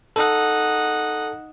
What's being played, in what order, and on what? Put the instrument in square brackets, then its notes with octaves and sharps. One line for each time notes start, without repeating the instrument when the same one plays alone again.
[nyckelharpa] D#4 F#5 [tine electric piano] A4